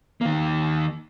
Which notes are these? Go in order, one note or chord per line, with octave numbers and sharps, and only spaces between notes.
D#3 A#3